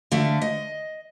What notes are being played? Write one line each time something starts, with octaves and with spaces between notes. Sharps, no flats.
D3 A3 E5 F5
D#5